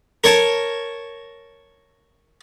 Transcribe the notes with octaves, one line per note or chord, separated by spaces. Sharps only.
A#4 C#5 A5